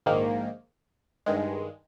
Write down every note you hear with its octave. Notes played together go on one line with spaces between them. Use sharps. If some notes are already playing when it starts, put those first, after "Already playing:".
A#1 G#2 D#3 A#3
G2 D#3 G#3